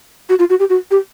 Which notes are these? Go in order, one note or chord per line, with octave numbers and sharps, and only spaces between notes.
F#4
F4
F#4
G4
F#4
G4